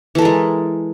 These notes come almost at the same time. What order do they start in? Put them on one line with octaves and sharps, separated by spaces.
E3 A4 A#4 G#3